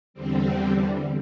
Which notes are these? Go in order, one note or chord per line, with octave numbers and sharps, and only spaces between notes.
E2 D3 G3 C4